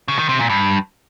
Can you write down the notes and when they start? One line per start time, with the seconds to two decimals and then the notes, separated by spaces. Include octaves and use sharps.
0.08 C#3
0.19 D#3
0.29 C3
0.39 A#2
0.49 G2